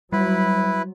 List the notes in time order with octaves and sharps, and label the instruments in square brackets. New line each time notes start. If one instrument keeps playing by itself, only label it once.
[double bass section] F#3 [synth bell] G3 [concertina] E4 B4